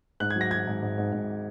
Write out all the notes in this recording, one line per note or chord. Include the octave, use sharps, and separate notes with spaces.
G#2 F#6
G#6
F#3
A#6
F#3 G#6
G#2
G#2
G#2
G#2